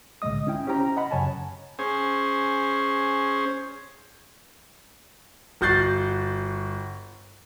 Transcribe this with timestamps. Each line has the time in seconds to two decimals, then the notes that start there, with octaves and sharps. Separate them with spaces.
0.22 C2 A2 D3 G#3 D#5 D#6
0.47 C#4 E4 G5
0.67 C#4 G4 C5 G5 A#5
0.81 A#5
0.97 D#5 F#5 B5
1.11 F#2 C#3 C#5 G#5 A5
1.79 C#4 G#4 C5
5.61 G1 F#4 F#6 G6 A6 C7